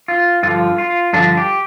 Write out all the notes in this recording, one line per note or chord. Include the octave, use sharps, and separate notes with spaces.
F4
G2 D3 F3 F4
F4
G2 D3 F3 D4
G4